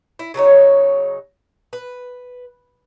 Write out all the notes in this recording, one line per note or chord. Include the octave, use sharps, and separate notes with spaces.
E4
C#3 F#3 D#4 C#5
B4